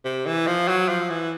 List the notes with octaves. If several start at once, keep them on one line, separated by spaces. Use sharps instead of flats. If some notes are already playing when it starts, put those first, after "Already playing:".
C3
E3
F3
F#3
F3
E3